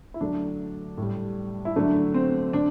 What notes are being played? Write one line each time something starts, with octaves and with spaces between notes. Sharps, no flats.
E4
D3 F#3 A3 D4
A2 G3
E4
D3 F#3 A3 D4
C4
D3 D4